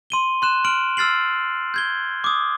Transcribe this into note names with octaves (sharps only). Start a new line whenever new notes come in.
C6 D#7 G7
C6 F#6 E7
C6 F6 D7 F#7
E6 F6 A6 C7 F#7
G6 G#6 G7
D6 D#6